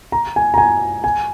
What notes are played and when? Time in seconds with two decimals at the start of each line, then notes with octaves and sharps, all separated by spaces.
0.12 A#5
0.36 G#5
0.54 A#5
0.58 G#5
1.04 G#5